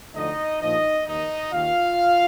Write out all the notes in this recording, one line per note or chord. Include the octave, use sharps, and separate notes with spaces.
D2 D3 F3 D#4 D#5
A#1 A#2 F3 D#4 D#5
D#2 D#3 D#4 D#5
D#2 D#3 F4 F5